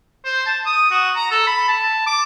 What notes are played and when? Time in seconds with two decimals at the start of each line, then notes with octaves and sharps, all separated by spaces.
0.25 C5
0.46 A5
0.66 D#6
0.91 F#4
1.16 A#5
1.31 A4
1.47 B5
1.68 A5
2.07 D6